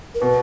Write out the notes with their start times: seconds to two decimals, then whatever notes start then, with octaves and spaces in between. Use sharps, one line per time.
0.15 A#4
0.21 B2 B4